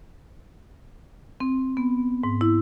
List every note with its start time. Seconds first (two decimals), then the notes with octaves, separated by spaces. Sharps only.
1.40 C4
1.77 B3
2.23 G#2
2.41 E4